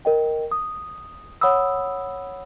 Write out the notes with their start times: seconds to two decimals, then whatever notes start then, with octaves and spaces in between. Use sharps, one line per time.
0.05 A#4 D#5 G5
0.52 D#6
1.41 C#5 F#5 B5 D#6 E6